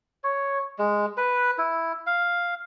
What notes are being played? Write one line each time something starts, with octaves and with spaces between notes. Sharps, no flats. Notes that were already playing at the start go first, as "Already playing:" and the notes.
C#5
G#3
B4
E4
F5